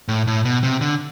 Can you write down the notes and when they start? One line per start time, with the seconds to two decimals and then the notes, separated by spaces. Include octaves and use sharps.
0.08 A2
0.27 A2
0.45 B2
0.63 C3
0.81 D3